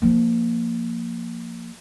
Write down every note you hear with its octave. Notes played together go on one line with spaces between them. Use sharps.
F3 A#3